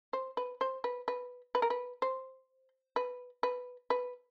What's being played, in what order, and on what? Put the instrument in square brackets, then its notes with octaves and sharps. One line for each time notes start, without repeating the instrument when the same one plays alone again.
[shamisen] C5
B4
C5
B4
B4
B4
A#4
B4
C5
B4
B4
B4